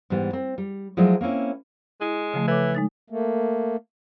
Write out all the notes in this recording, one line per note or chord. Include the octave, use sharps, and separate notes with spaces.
G#2 E3 G3 B3
C4
G3
F3 F#3 G#3 A3 E4 D5
A#3 C4 C#4 E4
G#3 E4
C#3 F3 A3
E3 A4 C#5 D6
G#3 D#4 A6
A3 A#3